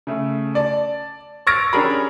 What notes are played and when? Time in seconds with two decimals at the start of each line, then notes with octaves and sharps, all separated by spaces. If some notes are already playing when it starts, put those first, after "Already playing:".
0.07 C#3 A3
0.55 D5 A5
1.47 C#6 E6 F6 A6 A#6 D7
1.73 C#4 D4 G4 G#4 A#4 B5